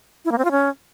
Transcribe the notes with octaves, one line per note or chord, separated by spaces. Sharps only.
E4
A#3
C4
F4
C#4